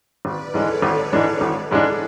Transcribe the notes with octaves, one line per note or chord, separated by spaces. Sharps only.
G#1 B4 D5
G#2 E3 G#3 D4 A4 C#5
G#1
G#2 E3 G#3 D4
G#1
G#2 E3 G#3 D4 A4